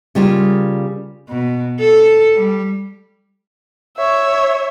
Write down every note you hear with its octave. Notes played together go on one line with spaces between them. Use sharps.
C#3 G3 A#3 F4
B2
A4
G3
C#5 E5